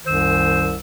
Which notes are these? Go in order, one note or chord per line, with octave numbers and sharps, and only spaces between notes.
C2 F#2 D#3 C5 E6